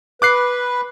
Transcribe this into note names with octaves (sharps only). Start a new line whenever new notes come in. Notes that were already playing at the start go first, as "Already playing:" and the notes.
B4 D6 F#6 C7